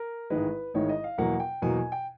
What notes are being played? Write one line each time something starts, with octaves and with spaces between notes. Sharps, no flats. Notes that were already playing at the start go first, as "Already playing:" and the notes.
Already playing: A#4
A1 G#2 D#3 G#3 B4
A1 G#2 D#3 G#3 C#5
D#5
F5
E2 B2 F#3 A#3 F#5
G5
E2 B2 F#3 A#3 G#5
G#5
G5